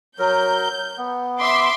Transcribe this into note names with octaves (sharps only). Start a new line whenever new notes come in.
F#3 A#4 G6
B3
E5 C6 D6